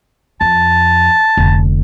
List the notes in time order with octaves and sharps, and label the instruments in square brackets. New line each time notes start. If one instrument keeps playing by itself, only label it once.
[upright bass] F2 [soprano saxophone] A5
[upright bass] F1 D3